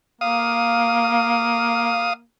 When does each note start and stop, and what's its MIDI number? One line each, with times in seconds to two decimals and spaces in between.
0.21 2.24 58
0.21 2.13 77
0.21 2.13 87